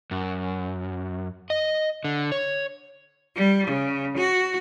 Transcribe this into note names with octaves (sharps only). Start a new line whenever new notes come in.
F#2
D#5
D3
C#5
G3
C#3
F#4